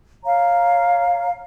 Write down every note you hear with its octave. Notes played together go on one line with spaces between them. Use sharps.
C#5 F5 A#5